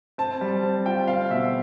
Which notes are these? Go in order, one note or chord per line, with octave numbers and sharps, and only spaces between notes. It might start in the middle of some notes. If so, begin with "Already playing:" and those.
C4 A5
G3
C4
F4 G5
C4 F5
B2 E5